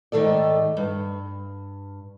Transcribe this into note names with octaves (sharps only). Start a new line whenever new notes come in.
G#2 D#3 A3 A4 D5
G2